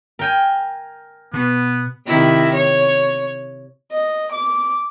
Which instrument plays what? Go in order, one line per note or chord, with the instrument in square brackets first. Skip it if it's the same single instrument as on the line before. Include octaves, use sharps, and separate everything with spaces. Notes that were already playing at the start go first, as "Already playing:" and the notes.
[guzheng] A#4 G5 G#5
[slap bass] B2 [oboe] B3
[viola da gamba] C3 D#3 E4
C#5
[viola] D#5
D6